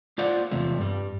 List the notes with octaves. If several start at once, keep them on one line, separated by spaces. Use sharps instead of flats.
A#3 F4 C5 D5 F#5
E2 C3 F3 A3
G2 G3